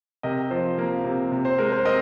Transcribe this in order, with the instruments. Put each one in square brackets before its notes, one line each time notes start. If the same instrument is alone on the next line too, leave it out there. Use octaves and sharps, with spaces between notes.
[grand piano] C3 A#4 D#5
F3 C5
A#3
C3
C3
C5
G#3 A#4
C5
C4 A#4 D#5